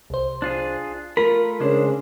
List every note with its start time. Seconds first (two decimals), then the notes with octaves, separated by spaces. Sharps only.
0.10 C2 C5
0.42 D4 F4 G#4
1.17 A3 F4 A#4 B5
1.60 C#3 G#3 D4 C5